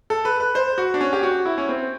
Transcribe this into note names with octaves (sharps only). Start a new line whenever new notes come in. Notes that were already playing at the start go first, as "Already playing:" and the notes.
A4
B4
B4
C5
F#4
D4
C#4
G4
F#4
E4
C#4
C4